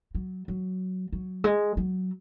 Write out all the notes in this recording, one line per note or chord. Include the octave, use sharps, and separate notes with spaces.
F#3
F#3
F#3
G#3
F#3